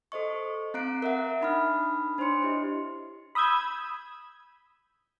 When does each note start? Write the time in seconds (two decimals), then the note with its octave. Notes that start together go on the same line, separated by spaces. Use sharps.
0.12 A4 C5 D#5 C#6
0.74 C4 F5 A#5 F#6 C7 D7
1.02 A#4 E5 F#5
1.41 D4 D#4 B5 D#6 F6
2.18 D4 C5 C#5 C6 C#7
2.43 E4 G4 D#5
3.35 B5 D#6 E6 G6 G#6